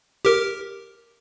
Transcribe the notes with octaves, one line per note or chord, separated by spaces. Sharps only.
G4 A#4